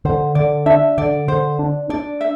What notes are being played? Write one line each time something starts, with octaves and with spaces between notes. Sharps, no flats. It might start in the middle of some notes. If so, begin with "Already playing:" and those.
D3 C5
D3 D5
D4 E5
D3 D5
D3 C5
D4
D4 D5
E5